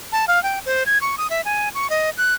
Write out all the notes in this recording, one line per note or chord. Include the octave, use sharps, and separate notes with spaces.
A5
F5
G5
C5
G#6
C#6
D#6
E5
G#5
C#6
D#5
F#6